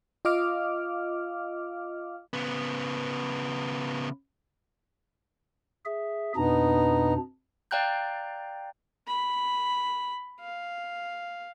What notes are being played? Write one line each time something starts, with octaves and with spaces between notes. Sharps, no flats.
F4 D#5 F5 D6 F6
C#3 B3
G#4 E5
F2 B2 B3 D4 D#4 A#5
D5 F5 G5 A#5 F#6 G6
B5
F5